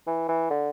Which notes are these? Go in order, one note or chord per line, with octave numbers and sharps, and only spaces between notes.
E3
E3
D3